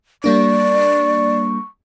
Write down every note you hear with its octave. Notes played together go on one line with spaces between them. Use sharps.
G3 A#3 D4 D5 C#6